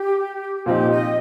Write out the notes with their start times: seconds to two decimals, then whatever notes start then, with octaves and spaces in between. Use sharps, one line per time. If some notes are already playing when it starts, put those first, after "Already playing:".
Already playing: G4
0.66 A#2 F3 C4 D#4 G4
0.91 D#5